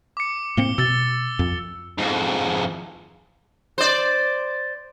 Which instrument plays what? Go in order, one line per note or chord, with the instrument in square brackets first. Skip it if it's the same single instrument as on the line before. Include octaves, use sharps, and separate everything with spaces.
[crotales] D6 C#7
[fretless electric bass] A2 A#3 C4 [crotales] C#7 G7
[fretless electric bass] B2 [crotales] E6 A6 G7
[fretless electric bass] F2
[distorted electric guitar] F2 G#2
[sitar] C5 D5